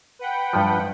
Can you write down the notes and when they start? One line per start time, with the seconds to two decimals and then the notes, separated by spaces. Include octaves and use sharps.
0.19 B4 F#5 G5
0.53 G2 F3